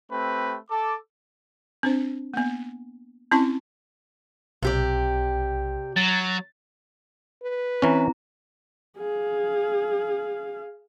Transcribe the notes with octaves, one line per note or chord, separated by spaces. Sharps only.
A3 C4 G4 B4
A4 A5 D6
C4 D4 C5
A#3 B3
C4 C#4 E4 A5 C#6
B1 C3 G4 D5
F#3 A6
B4
E3 C4 C#4 E4 A#5
G#4 F5